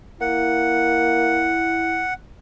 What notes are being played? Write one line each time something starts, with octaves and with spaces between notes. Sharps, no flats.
A#3 E4 F#5